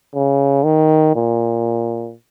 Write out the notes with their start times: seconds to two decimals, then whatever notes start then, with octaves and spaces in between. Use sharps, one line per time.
0.14 C#3
0.64 D#3
1.15 A#2